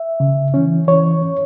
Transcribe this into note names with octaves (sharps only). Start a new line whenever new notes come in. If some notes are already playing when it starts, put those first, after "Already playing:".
Already playing: E5
C#3
E3 C#4
E3 C#5
C#4